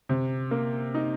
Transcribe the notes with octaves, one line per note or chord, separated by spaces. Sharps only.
C3
A#3
D#4